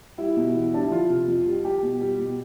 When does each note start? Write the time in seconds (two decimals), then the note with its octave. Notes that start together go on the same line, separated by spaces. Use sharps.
0.18 G3 E4
0.37 B2
0.55 E3
0.73 G3 D4
0.83 E4
0.91 F3 F4
1.10 C3
1.28 F2
1.46 G3
1.65 G3 G4
1.83 B2
2.01 G3
2.19 B2